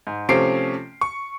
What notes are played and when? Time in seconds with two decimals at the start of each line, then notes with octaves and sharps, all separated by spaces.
0.07 G#2
0.29 C3 F3 A3 C#4 C7 D7
1.01 C#6